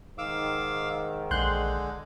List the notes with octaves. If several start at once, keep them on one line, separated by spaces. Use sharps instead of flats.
G#2 D#3 F5 D6 E6
A#1 D3 G#3 C6 F#6 G6